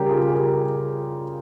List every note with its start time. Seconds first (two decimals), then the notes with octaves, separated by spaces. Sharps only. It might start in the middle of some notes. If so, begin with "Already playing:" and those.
Already playing: C#3 G3 G4 A#4
0.09 F4 G#4
0.27 G#4
0.33 G4 A#4